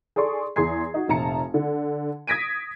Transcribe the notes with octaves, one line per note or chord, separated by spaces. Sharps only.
G#4 A4 D5 C6 C#6
E2 G#4 C6 G#6 C7
D#4 F#4
F1 A#1 A5 A#5 C#7
D3
D#6 G#6 A#6 B6 D7 D#7